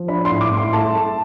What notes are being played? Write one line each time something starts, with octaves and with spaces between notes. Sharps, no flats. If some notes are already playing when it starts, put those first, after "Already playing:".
Already playing: F3
D4 B5
A2 C6
D6
A2
C6
A3 A5
A3